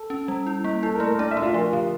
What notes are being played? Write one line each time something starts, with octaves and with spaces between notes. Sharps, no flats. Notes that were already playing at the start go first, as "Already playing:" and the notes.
Already playing: A4
C#4
G3
E4
A#3
E4 A4
A#4
A3
A#4
D4 D5
E5
A3
F4
F3 F4
D3